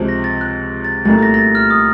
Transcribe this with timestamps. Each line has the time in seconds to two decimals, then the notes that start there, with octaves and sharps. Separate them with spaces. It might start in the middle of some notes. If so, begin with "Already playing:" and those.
Already playing: C#2 C3 F3
0.09 A#6
0.24 A6
0.41 F#6
0.85 A6
1.05 C2 A#2 A3 A6
1.23 A#6
1.34 A#6
1.39 A6
1.55 F6
1.70 D#6